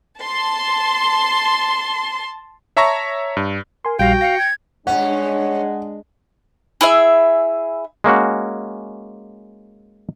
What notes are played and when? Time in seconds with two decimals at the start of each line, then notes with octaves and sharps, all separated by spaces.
0.19 A5 C6
2.77 C#5 E5 A5 A#5 C#6 A#6
3.37 G2
3.85 A#4 G#5 C6
3.99 A#1 G3 F#4 F5 G5 A#6
4.21 F5 A#6 C#7
4.38 G#6
4.87 G2 G#3 C#4 D4 F#5
6.81 E4 G#4 E5
8.04 G#3 A#3 C#4 F#4